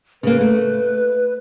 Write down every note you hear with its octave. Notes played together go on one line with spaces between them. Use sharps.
C#3 A#3 B4
A3